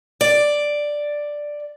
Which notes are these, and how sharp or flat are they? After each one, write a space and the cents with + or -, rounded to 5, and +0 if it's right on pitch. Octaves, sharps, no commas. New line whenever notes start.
D5 +5